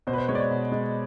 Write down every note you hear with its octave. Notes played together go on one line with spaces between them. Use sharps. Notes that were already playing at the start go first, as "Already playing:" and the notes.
B2 C5
B4
C5
G#3 C#5
D5
C#5
B2
G#3